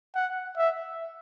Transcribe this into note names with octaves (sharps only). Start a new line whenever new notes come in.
F#5
E5